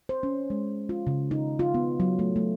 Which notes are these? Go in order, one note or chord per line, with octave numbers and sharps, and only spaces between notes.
C5
C#4
G#3
F4
C#3
D#4
F4
B3
F#3
A3
A3